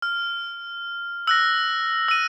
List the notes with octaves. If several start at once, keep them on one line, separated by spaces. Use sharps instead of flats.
F6
E6 F#6 A#6
E6 D#7